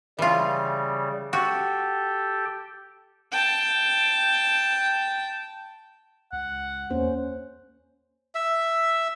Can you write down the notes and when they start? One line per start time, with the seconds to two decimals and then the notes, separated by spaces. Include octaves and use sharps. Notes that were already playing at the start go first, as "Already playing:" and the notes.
0.19 C#3 E3 G3 F4
1.33 F#4 G4 A4 G5
3.32 G5 A5
6.32 C#2 F#5
6.90 E2 A#3 C#4 C5
8.35 E5